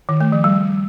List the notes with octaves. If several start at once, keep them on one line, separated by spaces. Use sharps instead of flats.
D#3
A3
F3
G3